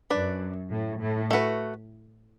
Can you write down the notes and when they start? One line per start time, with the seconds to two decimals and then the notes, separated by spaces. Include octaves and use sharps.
0.10 F#2 D4 B4 D5
0.71 A2
1.01 A2
1.31 A3 F#4 B4